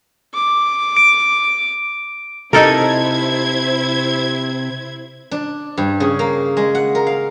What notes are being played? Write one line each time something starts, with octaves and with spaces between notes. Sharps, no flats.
D6
D7
C3 D#4 E4 A4 A#4 C5 G#6
D4
G2
C#3
A#3
G#3
F#5
A#4
F5